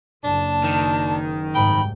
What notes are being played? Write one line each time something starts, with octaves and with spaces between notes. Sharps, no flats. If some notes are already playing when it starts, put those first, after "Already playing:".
F#1 D4 A5
D#3
F#1 C2 G#2 G5 B5